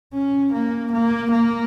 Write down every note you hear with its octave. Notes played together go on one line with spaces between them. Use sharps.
C#4
A#3
A#3
A#3